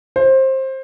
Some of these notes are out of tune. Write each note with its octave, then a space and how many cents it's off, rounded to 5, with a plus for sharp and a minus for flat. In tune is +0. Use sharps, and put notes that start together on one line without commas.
C5 +20